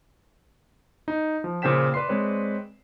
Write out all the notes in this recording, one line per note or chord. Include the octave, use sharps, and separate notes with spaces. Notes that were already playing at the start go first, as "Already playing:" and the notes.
D#4
F3
A#2 C#3 C5 G5 B6 E7
B4 D5 C6 C7
G#3 C4 B4 C#5 D5